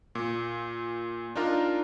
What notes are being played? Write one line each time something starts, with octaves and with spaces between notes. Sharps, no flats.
A#2
D4 D#4 F4 A#4